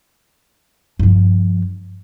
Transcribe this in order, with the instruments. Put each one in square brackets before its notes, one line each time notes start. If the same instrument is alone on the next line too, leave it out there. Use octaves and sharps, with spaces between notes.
[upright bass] G2 F3